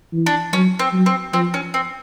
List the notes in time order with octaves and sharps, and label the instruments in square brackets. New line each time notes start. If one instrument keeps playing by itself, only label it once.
[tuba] E3
[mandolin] D4
[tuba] F#3 [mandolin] C#4
[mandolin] C4
[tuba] F#3
[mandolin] C4
[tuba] F3 [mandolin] C4
[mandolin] C#4
C4